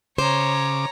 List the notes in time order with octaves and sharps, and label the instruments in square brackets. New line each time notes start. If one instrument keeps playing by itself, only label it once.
[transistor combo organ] C#3 D6 [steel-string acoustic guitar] C5 [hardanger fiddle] C#5 A#5